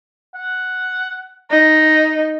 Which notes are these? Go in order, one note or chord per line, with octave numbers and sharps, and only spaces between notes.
F#5
D#4 A#5